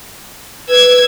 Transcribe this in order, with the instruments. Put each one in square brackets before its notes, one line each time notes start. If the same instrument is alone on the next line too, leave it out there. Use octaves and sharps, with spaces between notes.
[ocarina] B4 [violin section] E6 G#6